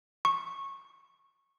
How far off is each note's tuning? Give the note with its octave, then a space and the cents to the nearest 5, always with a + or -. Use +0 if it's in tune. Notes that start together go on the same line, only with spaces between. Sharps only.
C#6 -15